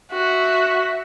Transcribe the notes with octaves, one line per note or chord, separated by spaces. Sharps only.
F#4 E5